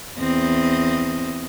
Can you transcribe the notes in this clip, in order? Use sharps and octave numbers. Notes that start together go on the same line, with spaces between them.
E2 C4 D#5